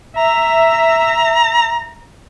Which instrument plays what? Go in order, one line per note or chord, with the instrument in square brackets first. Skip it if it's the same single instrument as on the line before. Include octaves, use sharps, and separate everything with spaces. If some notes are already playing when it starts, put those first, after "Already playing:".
[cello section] E5 [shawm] A#5